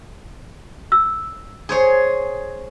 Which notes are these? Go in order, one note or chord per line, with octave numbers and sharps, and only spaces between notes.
E6
G#4 C5 C#5